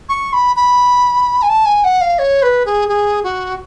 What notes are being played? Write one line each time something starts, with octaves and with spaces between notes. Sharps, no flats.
C#6
B5
B5
G#5
A5
G#5
F#5
F5
C#5
B4
G#4
G#4
F#4